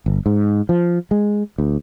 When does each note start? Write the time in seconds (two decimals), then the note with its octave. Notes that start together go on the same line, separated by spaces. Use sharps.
0.06 G1
0.26 G#2
0.69 F3
1.11 G#3
1.58 D2